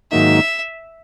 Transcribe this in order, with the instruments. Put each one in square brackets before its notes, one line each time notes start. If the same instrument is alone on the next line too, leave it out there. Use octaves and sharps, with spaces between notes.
[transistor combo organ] G#2 D#3 F#3 A#3 D#4 [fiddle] E5